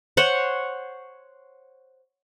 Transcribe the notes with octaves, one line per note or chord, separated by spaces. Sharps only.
C5 C#5 F#5